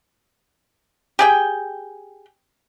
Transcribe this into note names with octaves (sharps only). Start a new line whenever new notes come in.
G4 G#4 G5